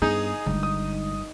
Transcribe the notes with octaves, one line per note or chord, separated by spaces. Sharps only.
G2 B3 D#4 G#4
G1 D3 G3 G#3
D#6